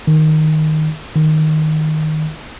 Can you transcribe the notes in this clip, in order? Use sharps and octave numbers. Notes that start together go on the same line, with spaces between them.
D#3
D#3